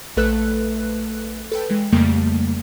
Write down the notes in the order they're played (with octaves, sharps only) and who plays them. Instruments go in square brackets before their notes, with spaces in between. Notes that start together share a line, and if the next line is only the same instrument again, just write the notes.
[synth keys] A#1 A3 A4 B4 F#6
A4 B4 G5
E3 G#3
F2 C#3 G3 A3 A#3